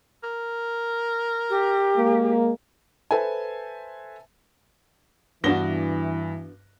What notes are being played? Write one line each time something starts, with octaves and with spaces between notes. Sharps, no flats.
A#4
G4
G#3 A#3
A4 B4 C5 E5 G#5
G2 E3 B3 D4 F#4 A#6 G7